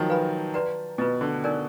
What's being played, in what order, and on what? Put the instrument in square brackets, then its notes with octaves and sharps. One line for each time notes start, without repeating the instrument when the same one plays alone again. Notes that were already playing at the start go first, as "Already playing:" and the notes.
Already playing: [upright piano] D#3 F3 F#3
[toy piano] B4 F5 G#5 B5
F#4 B4 D5 F#5 A#5
[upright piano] B2 [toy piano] F4 B4 D#5
[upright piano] D3
[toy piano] D#4 A#4 D5 G#5